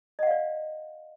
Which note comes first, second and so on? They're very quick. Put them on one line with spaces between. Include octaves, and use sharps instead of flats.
D#5 F#5 F5 D5